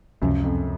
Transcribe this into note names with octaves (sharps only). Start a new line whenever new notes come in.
C#2 F#2 C3 F3
F2